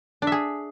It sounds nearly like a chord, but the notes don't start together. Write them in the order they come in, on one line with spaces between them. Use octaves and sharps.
D4 E5 G#4